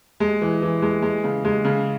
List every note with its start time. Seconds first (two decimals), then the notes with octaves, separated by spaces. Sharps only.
0.20 G#3
0.41 E3
0.62 E3
0.82 G#3
1.02 G#3
1.24 C#3
1.45 G#3
1.65 C#3